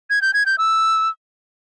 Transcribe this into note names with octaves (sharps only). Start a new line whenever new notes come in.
G#6
G6
G#6
G6
E6